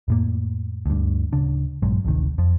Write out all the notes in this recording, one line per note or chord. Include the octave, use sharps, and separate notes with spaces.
F2 A2 A#3
D2 G2
D1 C#3 D4
A#1 G2 F#3 G#3
D1 A1 C3 D#3
F2 F3